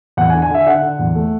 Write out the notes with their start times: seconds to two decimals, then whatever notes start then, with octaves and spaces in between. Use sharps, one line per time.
0.17 E2 F#5
0.30 G#5
0.34 D3
0.42 G#5
0.50 D3 E5
0.67 D3 F#5
0.82 D3
0.99 E2
1.15 A3